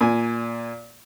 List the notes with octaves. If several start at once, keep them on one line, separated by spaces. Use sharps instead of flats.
A#2 G#5